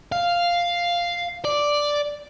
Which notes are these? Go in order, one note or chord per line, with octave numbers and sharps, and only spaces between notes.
F5
D5